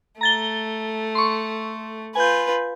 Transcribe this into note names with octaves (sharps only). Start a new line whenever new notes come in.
A3 A#5 A6 G7
C6 C#6
F4 B4 G#5 G6